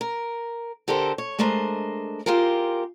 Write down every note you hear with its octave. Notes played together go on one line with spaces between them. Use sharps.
A#4
D3 G4 A4 A#4 C5
C#5
G#3 A3 D4 A#4 C5 D#5
C4 F4 G4 G#4 A#4